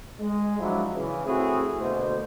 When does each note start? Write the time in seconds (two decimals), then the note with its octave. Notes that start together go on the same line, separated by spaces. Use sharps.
0.20 G#3
0.60 F3 F#3 G#3 D4 E4
0.95 C#3 E3
1.26 A3 C4 E4 F#4 G#4
1.80 D2 B2 A3 A#3 C5